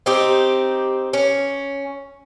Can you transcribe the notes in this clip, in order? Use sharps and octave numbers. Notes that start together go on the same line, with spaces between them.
C4 D#4 G4
C#4